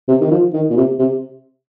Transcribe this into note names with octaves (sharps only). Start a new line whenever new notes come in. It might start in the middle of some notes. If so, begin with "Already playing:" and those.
C3
D#3
F3
D#3
A#2
C3
C3